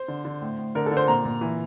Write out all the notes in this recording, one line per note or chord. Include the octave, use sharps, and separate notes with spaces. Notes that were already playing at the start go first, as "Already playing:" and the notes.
Already playing: C5
D3
D3
A2
A2
D3 A#4
A4
D3
C5
A#2 A#5
A#2
E3